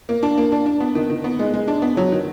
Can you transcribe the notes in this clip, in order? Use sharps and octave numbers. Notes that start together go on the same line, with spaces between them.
A#3
D4
A#3
D4
D4
B3
D#3
D#3
B3
G#3
G#3
D4
B3
F#3
D#3